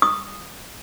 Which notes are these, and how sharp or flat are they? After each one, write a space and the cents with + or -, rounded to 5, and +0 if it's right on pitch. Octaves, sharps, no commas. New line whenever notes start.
D#6 -10